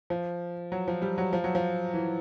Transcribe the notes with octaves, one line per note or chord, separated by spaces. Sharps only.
F3
F#3
F3
G3
F#3
F3
F#3
F3
E3